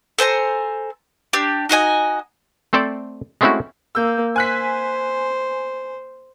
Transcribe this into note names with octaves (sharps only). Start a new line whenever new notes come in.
A4 C5 G#5 A#5
D4 G4
D#4 F#4 D#5 G#5
A3 C4 A4 C5 D5
G#3 A3 C4 C#4 E4 F#4
A#3 E6 G6
C5 G#5 F#6 B6